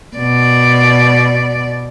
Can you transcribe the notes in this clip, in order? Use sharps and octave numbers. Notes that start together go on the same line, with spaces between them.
B2 D5